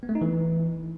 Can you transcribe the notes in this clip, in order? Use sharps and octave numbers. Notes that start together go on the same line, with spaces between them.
B3
A3
D#4
E3